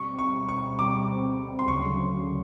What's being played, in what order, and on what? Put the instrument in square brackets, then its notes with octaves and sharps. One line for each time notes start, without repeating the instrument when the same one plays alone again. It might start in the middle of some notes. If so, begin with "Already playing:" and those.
Already playing: [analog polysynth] B2 G3 C4 [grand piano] C#6
[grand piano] C#6
C#6
[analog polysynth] B2 G3 C4 [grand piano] D6
[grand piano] C6
[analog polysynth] D2 C#3 F#3 [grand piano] C#6